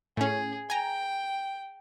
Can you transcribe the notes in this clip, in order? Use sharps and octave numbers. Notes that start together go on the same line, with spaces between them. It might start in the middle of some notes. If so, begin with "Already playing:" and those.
A2 C#4 G#4
G5 G#5 A#5